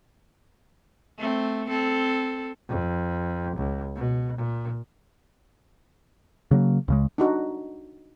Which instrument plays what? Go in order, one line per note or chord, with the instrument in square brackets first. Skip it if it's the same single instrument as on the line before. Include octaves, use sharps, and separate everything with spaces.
[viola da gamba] A3 C4
C4 A4
[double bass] F2
C#2
B2
A#2
[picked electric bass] C#3 F#3 A#3
C#2 C#3 G#3
[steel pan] D4 D#4 F#4